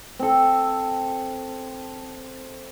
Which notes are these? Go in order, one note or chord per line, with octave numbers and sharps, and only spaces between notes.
C4 A4